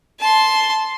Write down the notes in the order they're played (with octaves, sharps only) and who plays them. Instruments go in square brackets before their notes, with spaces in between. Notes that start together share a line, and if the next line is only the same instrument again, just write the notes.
[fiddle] A5 C6